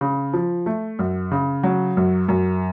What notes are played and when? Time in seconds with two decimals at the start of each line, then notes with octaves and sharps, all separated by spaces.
0.01 C#3
0.33 F3
0.66 A3
0.99 F#2
1.31 C#3
1.63 F#3
1.97 F#2
2.29 F#2